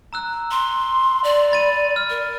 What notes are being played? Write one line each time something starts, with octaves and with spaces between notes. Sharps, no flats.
A#5 E6 F#6
C6
D5
B5 A6 D#7
F6
A#4